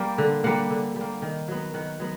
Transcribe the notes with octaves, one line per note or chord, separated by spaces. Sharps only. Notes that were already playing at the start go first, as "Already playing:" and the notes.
Already playing: G3 A#3
D3
G3 A#3 F#5
D3
G3 A#3
D#3
F#3 B3
D#3 F#5
F#3 B3